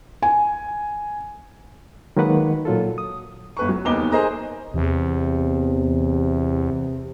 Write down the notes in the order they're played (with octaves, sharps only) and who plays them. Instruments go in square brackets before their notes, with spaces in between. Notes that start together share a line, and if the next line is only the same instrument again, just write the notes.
[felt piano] G#5
[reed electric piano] D#3 F#3 G#3 A#3 B4 F#5
A#2 F#3 F4 A4
D#6
[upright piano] G1 B4 C#6
F#3
F1 D#2 B3 D#5 D6 G7
G#4 A#4 C5 D#5 A#5
[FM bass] E2 [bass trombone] C3